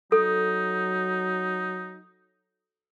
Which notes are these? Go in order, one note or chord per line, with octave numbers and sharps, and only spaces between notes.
F#3 D#4 A4